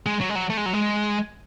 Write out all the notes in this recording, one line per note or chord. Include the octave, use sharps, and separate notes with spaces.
G#3
F#3
G#3
F#3
A3
G#3
F#3
G#3